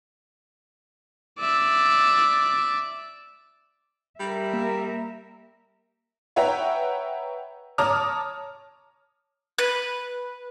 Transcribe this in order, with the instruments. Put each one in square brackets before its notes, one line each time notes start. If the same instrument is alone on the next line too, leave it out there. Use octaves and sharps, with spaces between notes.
[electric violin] D5 E5
[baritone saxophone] G3 [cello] A#4 E5
[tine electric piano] A#3
[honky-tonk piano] B4 C#5 E5 F#5 G5 A#5
C#5 A5 A#5 D6 D#6 F6
[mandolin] B4